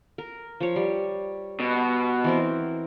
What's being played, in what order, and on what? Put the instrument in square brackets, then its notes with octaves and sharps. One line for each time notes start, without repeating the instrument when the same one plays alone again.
[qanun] A#4
F3 C#5
G3
[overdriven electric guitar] B2
[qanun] E3 C4 A#4